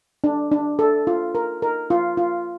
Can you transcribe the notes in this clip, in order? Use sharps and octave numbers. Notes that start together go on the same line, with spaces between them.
D4
D4
A4
F4
A#4
A#4
F4
F4